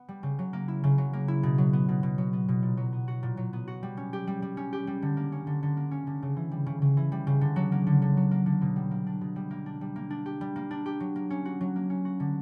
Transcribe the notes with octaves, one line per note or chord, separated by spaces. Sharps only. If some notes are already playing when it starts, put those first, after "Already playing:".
Already playing: B3
G3
C#3
F#3
A#3
E4
C#3
F#3
A#3
E4
B2
F#3
B3
B2
B2
F#3
B3
B2
A#2
F#3
B3
F#4
A#2
F#3
B3
F#4
G3
C#4
G4
G3
G3
C#4
G4
G3
D3
A#3
C#4
D3
D3
A#3
C#4
D3
C#3
E3
G3
C#3
C#3
E3
G3
C#3
D3
F#3
A#3
D3
D3
F#3
A#3
D3
B2
G3
A#3
D4
B2
G3
A#3
D4
G3
A#3
D4
G4
G3
A#3
D4
G4
F#3
A#3
C#4
F#4
F#3
A#3
C#4
F#4
D3